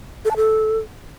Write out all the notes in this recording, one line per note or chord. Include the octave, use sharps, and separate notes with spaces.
A4
A5
A4